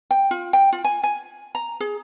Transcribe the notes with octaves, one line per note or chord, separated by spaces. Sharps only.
G5
F4
G5
F4
G#5
G#5
A#5
G#4